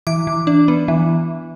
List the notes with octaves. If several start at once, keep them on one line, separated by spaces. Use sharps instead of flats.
E3 D6
E3
D4
B3
E3